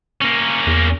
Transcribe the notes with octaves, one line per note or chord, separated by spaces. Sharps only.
A#3 C#4
E2